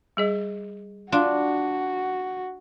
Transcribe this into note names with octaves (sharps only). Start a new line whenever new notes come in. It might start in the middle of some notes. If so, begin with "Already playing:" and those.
G3 G#4 D#5
D4 F4 F#4 F5 C6